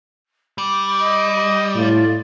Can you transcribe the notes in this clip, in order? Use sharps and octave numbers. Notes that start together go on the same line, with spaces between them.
G3 D6
D#5
A2 F4 D5